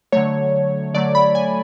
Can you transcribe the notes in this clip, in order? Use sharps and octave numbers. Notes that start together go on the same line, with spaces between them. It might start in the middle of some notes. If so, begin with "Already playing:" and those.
D3 F#3 A3 C#5
D3 F#3 A3 D5
B5
G#5